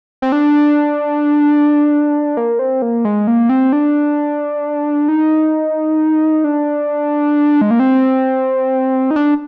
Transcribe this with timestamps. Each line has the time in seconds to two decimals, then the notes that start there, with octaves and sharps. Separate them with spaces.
0.22 C4
0.32 D4
2.37 A#3
2.59 C4
2.82 A#3
3.05 G#3
3.27 A#3
3.50 C4
3.73 D4
5.08 D#4
6.44 D4
7.62 G#3
7.71 A#3
7.80 C4
9.11 D#4
9.16 D4